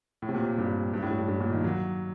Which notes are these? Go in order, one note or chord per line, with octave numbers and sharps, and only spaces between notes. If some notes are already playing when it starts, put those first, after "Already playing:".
A2
C3
A#2
G2
G2
A2
G2
G2
A#2
D#3
F#3